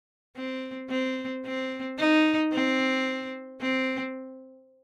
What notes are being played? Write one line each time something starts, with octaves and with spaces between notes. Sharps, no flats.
C4
C4
C4
D#4
C4
C4